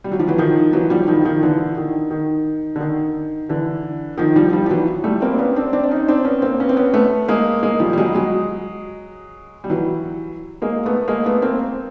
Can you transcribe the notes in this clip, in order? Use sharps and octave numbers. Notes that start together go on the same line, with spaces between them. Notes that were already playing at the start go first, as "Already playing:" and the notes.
G3
F#3
F3
E3 F#3
D#3 F3
E3 F#3
F3 G3
D#3 F3
D#3 F3
D3 E3
D#3
D#3
D3
D#3
D3 E3
D#3 F3
F3 G3
F3 G3
F3
E3 F#3
G3 A3
A#3 C4
D4
B3 C#4
C4 D4
C4 D4
D4
C#4 D#4
C4 D4
B3 C#4
A#3 C4
B3 C#4
C4
B3 C#4
A3 B3
G#3 A#3
G#3 A#3
F3 G3
G3
F#3 G#3
F#3 G#3
G3
E3 F#3
G#3 A#3
A3 B3
G#3 A#3
A3 B3
A#3 C4